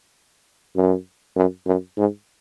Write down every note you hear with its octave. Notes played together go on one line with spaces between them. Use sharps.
F#2
F#2
F#2
G#2